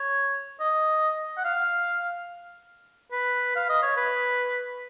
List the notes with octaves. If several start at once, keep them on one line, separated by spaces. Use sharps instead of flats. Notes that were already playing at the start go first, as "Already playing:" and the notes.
Already playing: C#5
D#5
F#5
F5
B4
F5
D#5
C#5
B4